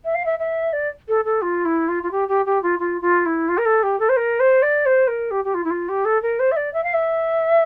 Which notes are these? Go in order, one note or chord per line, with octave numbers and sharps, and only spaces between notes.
E5
F5
E5
E5
D5
A4
A4
F4
E4
F4
F4
G4
G4
G4
F4
F4
F4
E4
F4
A#4
A4
G4
A4
C5
A#4
C5
D5
C5
A#4
G4
G4
F4
E4
F4
G4
A4
A#4
C5
E5
D5
E5
F5
E5